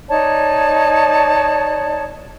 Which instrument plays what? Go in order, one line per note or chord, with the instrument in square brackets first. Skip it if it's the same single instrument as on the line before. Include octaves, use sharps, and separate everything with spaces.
[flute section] D#4 C#5 D5 A5